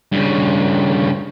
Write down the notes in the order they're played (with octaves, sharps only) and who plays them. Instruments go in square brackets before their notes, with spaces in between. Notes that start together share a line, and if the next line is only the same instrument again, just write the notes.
[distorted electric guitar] G2 C#3